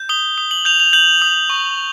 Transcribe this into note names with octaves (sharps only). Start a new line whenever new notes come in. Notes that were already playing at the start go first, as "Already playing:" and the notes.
Already playing: G6
D#6 G7
D#6
F#7
G6 F7
F7
G6 F#7
D#6
C#6